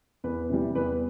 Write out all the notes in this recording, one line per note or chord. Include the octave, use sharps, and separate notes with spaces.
E2 B4
C3 E3 G3
E2 B4